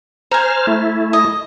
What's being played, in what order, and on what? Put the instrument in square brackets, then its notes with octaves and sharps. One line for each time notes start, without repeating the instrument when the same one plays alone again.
[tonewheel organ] C5 F6 [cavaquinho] G#5 A#5
[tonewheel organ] A3 E4
[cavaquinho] D#5